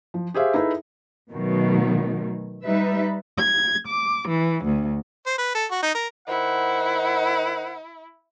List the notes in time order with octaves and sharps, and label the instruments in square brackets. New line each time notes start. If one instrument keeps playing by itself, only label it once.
[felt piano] F3
G4 G#4 C5 E5 F5
D#4 E4 G#4 A4 B4 E5
[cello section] B2 D#3 F#3 A3
G3 D#4 B4 E5
[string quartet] G#6
D6
E3
D2
[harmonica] C5
B4
A4
F#4
D#4
A#4
[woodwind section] D#3 C5 F#5 [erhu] E4